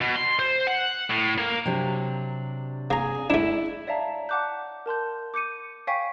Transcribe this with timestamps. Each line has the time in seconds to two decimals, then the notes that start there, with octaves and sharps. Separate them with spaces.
0.01 B2
0.16 C6
0.39 C5
0.67 F#5
1.10 A2
1.38 A#3
1.66 C3 F#3 D4
2.90 A#3 G#4 A#5
3.30 A3 D4 E4
3.87 C#5 D5 E5 F5 A5 A#5
4.29 F#5 A5 D6 F#6 G6
4.86 A#4 A5 C6 G6
5.34 D6 G6 C#7 D#7
5.87 C#5 F5 G5 G#5 C#6 B6